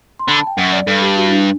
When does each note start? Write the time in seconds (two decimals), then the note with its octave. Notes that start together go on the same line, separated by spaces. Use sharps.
0.19 C6
0.28 D3 B5
0.37 A5
0.47 G5
0.57 F#2 F#5
0.72 D5
0.87 G2 A4
1.01 G4
1.16 F#4
1.26 E4
1.31 D4